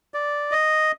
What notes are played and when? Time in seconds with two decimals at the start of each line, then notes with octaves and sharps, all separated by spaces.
0.14 D5
0.52 D#5